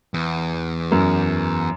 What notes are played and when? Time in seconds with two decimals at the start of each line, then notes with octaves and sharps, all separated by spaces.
0.14 E2
0.91 F#2